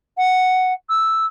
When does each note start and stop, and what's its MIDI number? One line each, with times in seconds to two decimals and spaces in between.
0.18 0.73 78
0.90 1.26 88